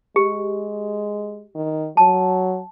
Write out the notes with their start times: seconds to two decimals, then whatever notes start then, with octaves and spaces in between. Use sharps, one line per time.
0.16 G#3 G4
1.55 D#3
1.97 F#3 A5